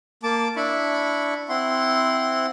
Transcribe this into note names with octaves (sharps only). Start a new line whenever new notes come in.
A#3 A5 D6
D4 E4 B5 C#6
C4 E4 F#5 C6